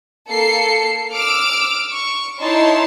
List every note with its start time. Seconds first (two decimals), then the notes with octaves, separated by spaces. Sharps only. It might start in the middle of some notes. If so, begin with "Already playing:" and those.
0.29 A#3 A4 C7 C#7
1.15 D6 E6 F6 D7
1.92 C#6
2.40 D#4 E4 C#5 A5 C6